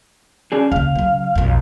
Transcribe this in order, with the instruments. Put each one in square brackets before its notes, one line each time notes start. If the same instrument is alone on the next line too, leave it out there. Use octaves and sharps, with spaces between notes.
[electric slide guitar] C#4 D4 G#4
[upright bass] D#2 C#3 [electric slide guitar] F5
[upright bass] C#3 F#3
B1 F2